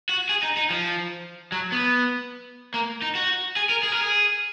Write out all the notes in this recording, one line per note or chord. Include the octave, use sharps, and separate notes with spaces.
F#4
G#4
D#4
D#4
F3
F#3
B3
A#3
D#4
F#4
G#4
A#4
G#4
A#4
G#4